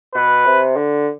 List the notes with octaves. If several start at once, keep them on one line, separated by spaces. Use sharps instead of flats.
B2 B4
C3
D3